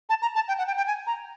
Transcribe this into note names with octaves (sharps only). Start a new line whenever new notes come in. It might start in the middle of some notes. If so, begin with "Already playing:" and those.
A5
A#5
A5
G5
F#5
G5
G5
G#5
A#5